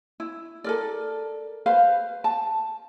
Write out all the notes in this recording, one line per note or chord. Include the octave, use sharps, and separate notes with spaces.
E4
A4 A#4 D5
B4 C5 F5
A5